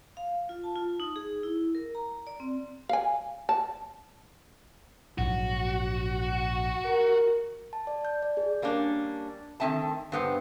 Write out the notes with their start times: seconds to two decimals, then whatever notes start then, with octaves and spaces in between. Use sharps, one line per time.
0.17 F5
0.49 F4
0.64 A5
0.76 F4
1.00 D#4
1.16 G#4
1.43 E4
1.75 A#4
1.95 A#5
2.27 D5
2.40 C4
2.89 F5 G#5
3.49 A5
5.18 A#1 G#2 F#3 F#4
6.86 A#4
7.73 A5
7.87 D5
8.05 G6
8.23 D5
8.37 G#4
8.62 G3 A#3 C#4 D4
9.60 D#3 A3 C4 E5 A5
10.12 G2 B3 C5